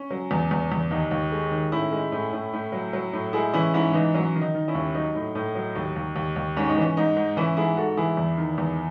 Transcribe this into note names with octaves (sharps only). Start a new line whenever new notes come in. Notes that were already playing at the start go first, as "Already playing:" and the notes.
Already playing: C#4
F#3
E2
E2
E2
D#2 D#4
D#2
G#3
D#3
A2 C#4 E4
G#3
A2
A2
A2
F#3
F#3
A2
G#3 E4 G#4
E3 C#4 E4
G#2 C#4 E4
E3 D#4
F#3 C#4
D#3
D#4
D#3
C#4 E4
D#2
F#3 D#4
A2
A2
F#3
D#2
D#2
D#2
D#2
G#2 C#4
D#4
E3
C#4
G#2 D#4
G#2
E3 C#4 E4
G#2 E4 G#4
G#2 F#4 A4
E3 E4 G#4
E2
D#3
E2